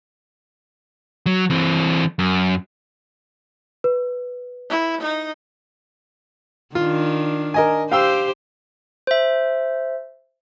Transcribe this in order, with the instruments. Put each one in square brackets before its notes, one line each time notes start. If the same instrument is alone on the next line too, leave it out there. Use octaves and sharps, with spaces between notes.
[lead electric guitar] F#3
E3 C4
F#2
[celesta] B4
[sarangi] E4
D#4
[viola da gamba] D#3 D4 [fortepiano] F4
[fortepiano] A#4 D#5 G#5
[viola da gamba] G4 C5 [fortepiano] F5 G5 E6
[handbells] C5 E5